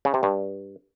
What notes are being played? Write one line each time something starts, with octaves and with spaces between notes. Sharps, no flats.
C#3
C3
G2